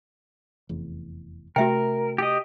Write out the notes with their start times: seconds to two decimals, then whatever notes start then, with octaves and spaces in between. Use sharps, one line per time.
0.69 F1 E2
1.56 C3 A3 F#4 A#4 E5 G5
2.18 G4 D#5